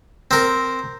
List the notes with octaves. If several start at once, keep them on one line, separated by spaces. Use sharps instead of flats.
C4 A#4